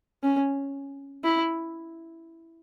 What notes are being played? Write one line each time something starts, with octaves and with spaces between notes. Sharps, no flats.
C#4
E4